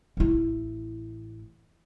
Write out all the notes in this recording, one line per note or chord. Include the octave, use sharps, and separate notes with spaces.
A1 E4